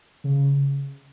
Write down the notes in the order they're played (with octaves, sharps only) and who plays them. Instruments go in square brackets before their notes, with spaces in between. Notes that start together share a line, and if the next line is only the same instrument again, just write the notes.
[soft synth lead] C#3